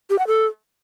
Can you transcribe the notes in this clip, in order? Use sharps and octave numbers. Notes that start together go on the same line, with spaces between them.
G4
F#5
A4